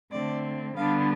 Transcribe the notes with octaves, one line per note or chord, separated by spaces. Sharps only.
D3 A3 C4 D5
D3 G3 B3 D4 F5